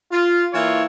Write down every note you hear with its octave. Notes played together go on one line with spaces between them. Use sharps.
F4
E3 A#3 E4 F4 C#5